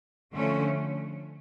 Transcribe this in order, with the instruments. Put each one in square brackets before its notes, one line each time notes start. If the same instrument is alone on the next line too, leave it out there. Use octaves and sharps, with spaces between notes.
[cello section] D3 F3 A3 C#4